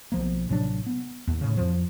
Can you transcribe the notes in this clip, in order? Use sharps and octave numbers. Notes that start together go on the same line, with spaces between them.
B1 F3 A#3
A1 C3 F#3 D4
B3
D#2
A2 C#3
F2 F3